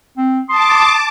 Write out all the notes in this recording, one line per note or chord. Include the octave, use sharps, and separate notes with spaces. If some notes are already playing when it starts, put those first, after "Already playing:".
C4
A5 C6 D6 D#6